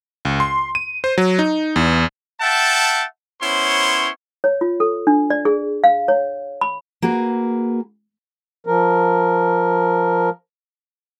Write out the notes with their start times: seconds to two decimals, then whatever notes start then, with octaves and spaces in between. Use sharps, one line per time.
0.25 C#2
0.40 C6
0.75 D#7
1.04 C5
1.18 F#3
1.39 D#4
1.76 E2
2.41 E5 F#5 G5 A5
3.42 B3 C#4 E4 C5 C#5 C6
4.44 C#5
4.61 F4
4.80 A4
5.07 D4
5.30 D5
5.45 G#4
5.84 F5
6.08 C#5
6.61 B5
7.02 A#3 F#4 G#4 B4
8.67 F3 A#4